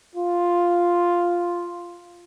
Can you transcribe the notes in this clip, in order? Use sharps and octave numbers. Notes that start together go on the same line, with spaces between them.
F4